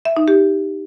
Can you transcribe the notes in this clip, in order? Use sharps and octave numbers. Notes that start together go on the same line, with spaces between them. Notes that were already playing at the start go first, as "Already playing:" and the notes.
E5
D#4
G4